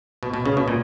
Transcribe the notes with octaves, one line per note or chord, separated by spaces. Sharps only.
B2
B2
C#3
B2
A#2